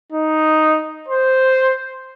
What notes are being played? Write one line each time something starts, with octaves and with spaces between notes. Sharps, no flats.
D#4
C5